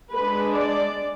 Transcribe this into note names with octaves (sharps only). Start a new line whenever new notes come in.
G#3 D4 B4
D5